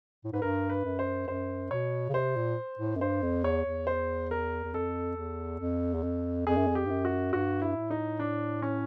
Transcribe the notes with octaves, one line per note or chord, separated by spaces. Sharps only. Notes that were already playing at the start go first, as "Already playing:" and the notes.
A2
G#2 B4
G2 A#4
B4
F#2
C5
F#2 C5
B2 C#5
C#3
C3 C5
A#2
A2
F#2
G2 C5
F2
E2 C#5
E2
C5
A#4
E2
F2 A4
E2
F2
E2
F2
F2 G#4
F#2
F2
G4
G2
F#2
F#4
G2 F#4
E4
A2
D#4
D4
C#4